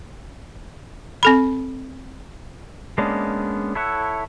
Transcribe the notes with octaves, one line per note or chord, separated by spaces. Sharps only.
C4 A4 B5
G#3 A#3 B3 C#4 D4
E4 A4 C#5 E5 F#5